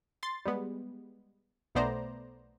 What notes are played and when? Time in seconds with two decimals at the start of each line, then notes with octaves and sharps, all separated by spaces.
0.23 C6 A6
0.46 G3 G#3 B3
1.75 B1 A3 B3 C5 D5 A#5